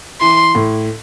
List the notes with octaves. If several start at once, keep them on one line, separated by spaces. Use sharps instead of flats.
E3 C6
A2